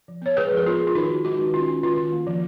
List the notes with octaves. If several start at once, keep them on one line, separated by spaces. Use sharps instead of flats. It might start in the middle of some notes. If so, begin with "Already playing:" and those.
F3
B3 C#5
G#3 G#4 B4
F3
A#4
B3 F4 G#4
B3
F4
D#3 D#4 F#4
D#3
G#3 D#4 F#4
D#3
C#4 F4
C#4
D#3 F4
D#3
A#3
F3